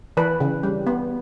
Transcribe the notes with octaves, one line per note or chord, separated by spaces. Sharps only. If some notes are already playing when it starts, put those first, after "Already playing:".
E3 B4
C#3
G3
B3